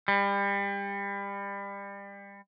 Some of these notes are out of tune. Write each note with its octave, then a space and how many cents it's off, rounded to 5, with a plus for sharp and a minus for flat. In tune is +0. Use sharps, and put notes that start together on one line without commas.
G3 +30